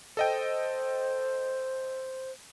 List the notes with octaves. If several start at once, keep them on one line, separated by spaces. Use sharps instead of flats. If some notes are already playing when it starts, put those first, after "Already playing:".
A4 C5 D#5 G5